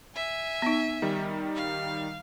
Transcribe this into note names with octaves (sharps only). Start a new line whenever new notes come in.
E5 G#5
B3 D#4
D#3 G3
F5